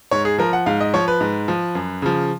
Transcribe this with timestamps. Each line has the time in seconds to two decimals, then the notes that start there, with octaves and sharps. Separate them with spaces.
0.11 G#2 C#5
0.25 G#4
0.38 F3 A#4
0.53 F#5
0.66 G#2 F5
0.81 D#5
0.93 F3 C#5
1.08 B4
1.21 G#2
1.48 F3
1.75 F#2
2.02 C#3 F3